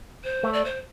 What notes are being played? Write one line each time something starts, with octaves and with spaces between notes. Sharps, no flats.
C5
A3
D5
C5